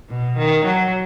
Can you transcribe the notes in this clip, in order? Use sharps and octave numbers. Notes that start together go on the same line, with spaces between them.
B2
D#3
F#3